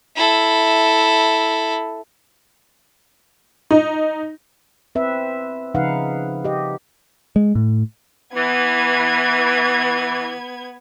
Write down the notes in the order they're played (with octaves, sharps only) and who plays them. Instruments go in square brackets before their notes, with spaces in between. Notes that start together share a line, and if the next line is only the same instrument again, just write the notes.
[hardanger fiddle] E4 A4
[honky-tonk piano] D#4
[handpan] C4 B4 E5
C#3 F3 D#4 B4 F5 F#5
G4 D#5
[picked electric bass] G#3
A2
[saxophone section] E3 [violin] B3 G#6